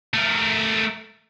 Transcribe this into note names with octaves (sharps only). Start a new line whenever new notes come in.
A3 A#4